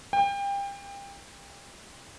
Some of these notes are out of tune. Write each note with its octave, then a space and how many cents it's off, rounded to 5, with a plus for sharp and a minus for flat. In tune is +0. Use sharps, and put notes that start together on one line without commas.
G5 +30